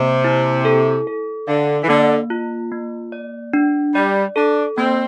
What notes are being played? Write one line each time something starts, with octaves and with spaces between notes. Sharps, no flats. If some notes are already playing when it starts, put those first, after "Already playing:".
Already playing: C3 A#3
E4
A4
A4
D3 F5
E3
D3 A#3
F4
A#3
D5
D4
G3 D5
D4 A4
A#3 C4